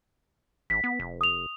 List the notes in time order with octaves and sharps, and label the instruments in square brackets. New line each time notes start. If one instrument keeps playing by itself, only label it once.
[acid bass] A1 [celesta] B6
[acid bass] B3
F1
[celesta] D#6 F7